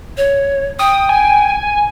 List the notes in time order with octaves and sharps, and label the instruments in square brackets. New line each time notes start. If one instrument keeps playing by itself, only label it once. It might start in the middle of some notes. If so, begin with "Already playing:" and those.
[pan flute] C#5
[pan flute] G5 [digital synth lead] D#6
[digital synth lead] G#5